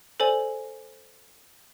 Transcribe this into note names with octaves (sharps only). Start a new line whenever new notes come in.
A4 C5 D5 G#5